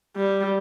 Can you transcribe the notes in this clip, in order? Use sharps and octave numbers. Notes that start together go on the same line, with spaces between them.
G3